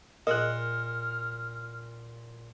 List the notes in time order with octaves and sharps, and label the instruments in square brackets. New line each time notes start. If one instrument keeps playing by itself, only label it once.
[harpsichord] A#2 [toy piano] G#4 A#4 [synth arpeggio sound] D#5 F#6 [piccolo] F6